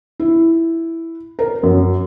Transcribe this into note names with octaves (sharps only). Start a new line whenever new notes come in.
E4
A#4
F#2